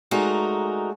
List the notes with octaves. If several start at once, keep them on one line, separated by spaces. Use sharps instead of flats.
G#3 A3 D4 D#4 F#4 A#4